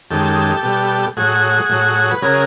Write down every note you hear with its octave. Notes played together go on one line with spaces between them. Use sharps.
F#2 D#3 G#3 G4 A4
B2 G3
A2 F#3 F#4 G#4
A2 F#3
B4
C#3 F#3 G#4 A#4